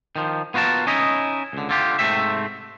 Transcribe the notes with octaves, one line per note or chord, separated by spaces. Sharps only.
D#3 F3
B3 F4 F#4 A#4 A5
C#4 D#4 E4 D#5
C#2 D3
D3 F4 G4
G#2 C3 A3 C4 E5